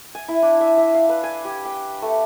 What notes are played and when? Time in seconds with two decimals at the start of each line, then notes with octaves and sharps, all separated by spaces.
0.15 G#5
0.28 E4
0.42 D4
0.61 E5
0.77 E5
0.94 F5
1.09 B4
1.23 G#5
1.45 G4
1.65 G5
2.02 A3